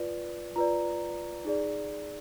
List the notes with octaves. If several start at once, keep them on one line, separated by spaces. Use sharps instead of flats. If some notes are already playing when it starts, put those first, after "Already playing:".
Already playing: F4 B4 D5
F4 B4 D5 A#5
D#4 G#4 D5